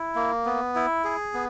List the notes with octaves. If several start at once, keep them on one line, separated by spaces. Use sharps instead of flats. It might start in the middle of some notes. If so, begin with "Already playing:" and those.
Already playing: E4
A#3
B3
E4
G#4
B3